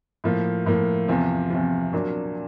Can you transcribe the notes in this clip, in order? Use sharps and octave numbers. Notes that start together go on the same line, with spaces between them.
A2 F3 A#3
A2 F3 A#3
E2 C3 F3
E2 C3 F3
A#2 F#3 A#3 D4